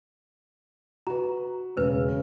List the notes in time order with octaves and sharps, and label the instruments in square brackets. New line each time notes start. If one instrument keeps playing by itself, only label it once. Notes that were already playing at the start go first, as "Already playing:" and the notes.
[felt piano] F#4 B4 [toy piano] A#5
[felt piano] E1 [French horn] C#3 [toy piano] A#4 B4